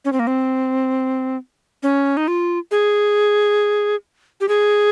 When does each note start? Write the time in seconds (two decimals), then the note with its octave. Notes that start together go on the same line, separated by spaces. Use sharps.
0.05 C#4
0.13 C4
0.19 A#3
0.27 C4
1.83 C#4
2.17 D#4
2.28 F4
2.71 G#4
4.41 G4
4.48 G#4